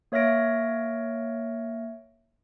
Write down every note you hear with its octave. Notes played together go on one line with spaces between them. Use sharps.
A#3 C#5 E5 F6 A#6 D7